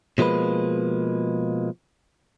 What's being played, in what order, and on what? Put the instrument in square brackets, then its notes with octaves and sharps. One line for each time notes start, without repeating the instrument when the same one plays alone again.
[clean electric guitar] B2 F3 G#3 A#3 B4